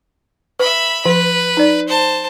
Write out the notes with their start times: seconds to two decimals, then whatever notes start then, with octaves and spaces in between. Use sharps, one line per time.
0.60 B4 E5 B5
1.05 F3 B4
1.57 D#4 D5
1.88 C5 A5